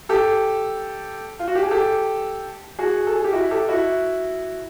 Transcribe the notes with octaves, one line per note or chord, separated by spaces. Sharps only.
G4 A4
F4
F#4
G4
G#4
G4 A4
F#4 G#4
A4
G#4
G4
E4 F#4
G4 A4
E4 F#4